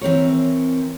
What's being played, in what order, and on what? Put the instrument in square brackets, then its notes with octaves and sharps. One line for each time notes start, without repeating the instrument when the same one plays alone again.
[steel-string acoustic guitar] E3 C4 A#4 C#5